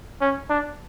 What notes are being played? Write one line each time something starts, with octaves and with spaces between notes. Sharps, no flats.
C#4
D4